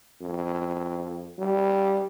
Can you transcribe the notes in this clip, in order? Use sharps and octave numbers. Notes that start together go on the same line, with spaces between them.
F2
G3